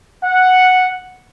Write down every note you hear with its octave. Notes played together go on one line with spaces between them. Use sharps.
F#5